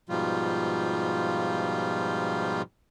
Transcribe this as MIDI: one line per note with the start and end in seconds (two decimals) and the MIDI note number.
0.09 2.62 44
0.09 2.62 47
0.09 2.62 53
0.09 2.62 55
0.09 2.62 65